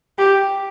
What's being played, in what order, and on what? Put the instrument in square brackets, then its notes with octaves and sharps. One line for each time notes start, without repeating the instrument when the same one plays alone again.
[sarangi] G4